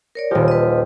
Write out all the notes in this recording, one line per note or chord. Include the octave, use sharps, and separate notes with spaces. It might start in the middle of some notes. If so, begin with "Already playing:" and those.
A#4 C#5 D5
D#1 F3 G4
B4 D#5